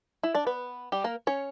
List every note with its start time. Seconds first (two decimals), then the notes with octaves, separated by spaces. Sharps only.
0.23 E4 E5
0.35 D4 D5
0.47 B3 B4
0.92 G3 G4
1.04 A#3 A#4
1.27 C#4 C#5